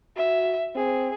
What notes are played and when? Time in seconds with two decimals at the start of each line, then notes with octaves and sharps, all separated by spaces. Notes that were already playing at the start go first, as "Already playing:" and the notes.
0.17 F#4 E5
0.75 C4 G#4